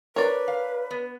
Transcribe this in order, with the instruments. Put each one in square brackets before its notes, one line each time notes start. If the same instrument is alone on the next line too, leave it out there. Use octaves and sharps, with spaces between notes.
[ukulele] D4 A#4 [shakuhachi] B4 [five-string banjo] C#5 D5
[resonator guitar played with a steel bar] F5
B3